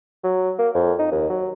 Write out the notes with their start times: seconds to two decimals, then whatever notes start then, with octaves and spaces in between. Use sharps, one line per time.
0.24 F#3
0.59 A#3
0.75 F2
0.99 D#4
1.12 D#2
1.30 F#3